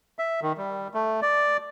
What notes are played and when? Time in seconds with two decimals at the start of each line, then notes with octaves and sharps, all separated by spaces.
0.19 E5
0.42 D#3
0.57 G3
0.94 A3
1.22 D5